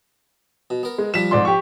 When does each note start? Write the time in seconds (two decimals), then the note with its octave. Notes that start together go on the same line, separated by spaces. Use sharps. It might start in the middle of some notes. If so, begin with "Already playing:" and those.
0.70 B2
0.83 B3 A#4
0.98 G#3
1.14 F3 G3 F4 B6 E7
1.31 F2 G#2 D5 C6
1.45 G4 C#6